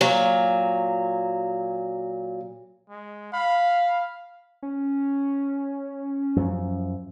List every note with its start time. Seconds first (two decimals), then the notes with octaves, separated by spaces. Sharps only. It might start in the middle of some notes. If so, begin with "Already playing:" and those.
0.01 A#2 F#3
2.90 G#3
3.33 F5 B5
4.62 C#4
6.36 F#2 F3